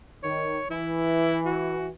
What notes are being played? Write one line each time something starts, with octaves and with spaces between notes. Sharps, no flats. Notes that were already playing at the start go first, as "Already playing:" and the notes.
D#3 C#5
E3 E4
F#4